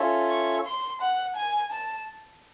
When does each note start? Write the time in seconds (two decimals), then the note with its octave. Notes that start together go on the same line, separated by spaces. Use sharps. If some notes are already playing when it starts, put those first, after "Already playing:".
Already playing: C#4 F4 A4 C#5 E5
0.30 C#6
0.65 C6
1.01 F#5
1.36 G#5
1.72 A5